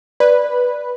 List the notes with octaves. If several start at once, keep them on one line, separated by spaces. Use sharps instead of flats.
B4 D5